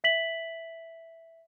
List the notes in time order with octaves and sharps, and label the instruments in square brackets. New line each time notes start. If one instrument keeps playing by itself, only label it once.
[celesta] E5 B6 F#7